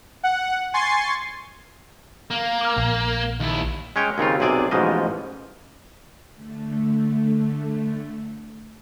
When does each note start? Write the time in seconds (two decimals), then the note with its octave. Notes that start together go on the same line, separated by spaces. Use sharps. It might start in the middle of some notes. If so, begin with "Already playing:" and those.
0.23 F#5
0.74 G#5 C6 C#6 A6 C7
2.31 A#3
2.61 D6 F6
2.77 A#1
3.40 D#2 E4
3.96 G#3 C#4 C#5 G5
4.18 D#2 C#3 C4 F4
4.40 B1 C3 G#4 D5 G#5
4.71 A1 G#2 B2 F3 D#5
6.31 D3 A3